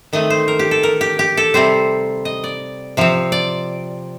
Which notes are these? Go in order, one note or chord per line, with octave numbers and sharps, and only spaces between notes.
D#3 A3 C4 D#5
C5
A#4
G4
A4
A#4
G4
G4
A4
C3 G3 C4 C5
D#5
D5
C3 F3 C4
D5